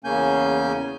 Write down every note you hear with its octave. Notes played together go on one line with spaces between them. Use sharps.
E2 C#3 A#3 C#4 G#5 G6